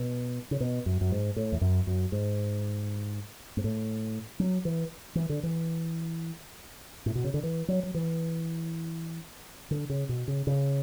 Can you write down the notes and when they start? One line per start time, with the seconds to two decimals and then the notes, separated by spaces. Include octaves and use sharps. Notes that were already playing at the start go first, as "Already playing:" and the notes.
Already playing: B2
0.51 C#3
0.60 B2
0.86 F#2
1.01 F#2
1.11 G#2
1.36 A2
1.52 E2
1.61 F#2
1.87 F#2
2.12 G#2
3.57 G#2
3.64 A2
4.40 F#3
4.65 E3
5.15 E3
5.29 D3
5.43 E3
7.06 A2
7.15 B2
7.24 C#3
7.34 D3
7.43 E3
7.68 F#3
7.83 F#3
7.94 E3
9.71 D3
9.89 C#3
10.09 B2
10.28 C#3
10.47 C#3